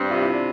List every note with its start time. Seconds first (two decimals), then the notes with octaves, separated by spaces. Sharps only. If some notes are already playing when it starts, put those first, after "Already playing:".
Already playing: G2 C4 D4
0.10 C3 F4
0.22 E4
0.34 D4